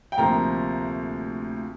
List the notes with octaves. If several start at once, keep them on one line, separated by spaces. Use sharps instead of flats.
G5
D2 C3 F3 A#3 A#5